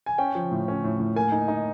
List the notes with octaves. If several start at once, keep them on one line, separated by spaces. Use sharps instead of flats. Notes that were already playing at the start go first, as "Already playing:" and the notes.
G#5
C#4 G5
F3
A2
C#4
A2
A2
A#3 G#5
D#4
D#4